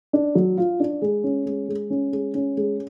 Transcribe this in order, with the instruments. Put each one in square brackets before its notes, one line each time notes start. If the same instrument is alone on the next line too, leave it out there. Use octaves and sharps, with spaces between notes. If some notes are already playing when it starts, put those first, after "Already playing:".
[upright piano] D4
F#3
F4
D4
G#3
C#4
G#3
G#3
C#4
G#3
C#4
G#3